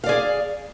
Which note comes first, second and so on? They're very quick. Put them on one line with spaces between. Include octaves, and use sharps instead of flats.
F5 D5 G#4